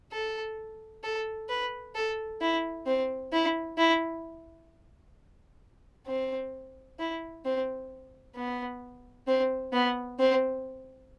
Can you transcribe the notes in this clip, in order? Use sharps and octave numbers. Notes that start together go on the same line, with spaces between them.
A4
A4
B4
A4
E4
C4
E4
E4
C4
E4
C4
B3
C4
B3
C4